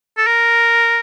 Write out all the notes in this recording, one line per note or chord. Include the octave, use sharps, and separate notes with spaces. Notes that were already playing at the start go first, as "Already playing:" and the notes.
A4
A#4